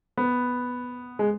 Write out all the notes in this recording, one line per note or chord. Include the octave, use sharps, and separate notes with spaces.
B3
G#3